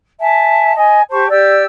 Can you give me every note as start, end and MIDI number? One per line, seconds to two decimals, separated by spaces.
0.20 0.73 76
0.20 0.73 80
0.20 0.73 81
0.76 1.01 75
0.76 1.01 80
1.10 1.25 67
1.10 1.25 72
1.10 1.25 81
1.10 1.25 85
1.29 1.62 67
1.29 1.62 74
1.29 1.62 88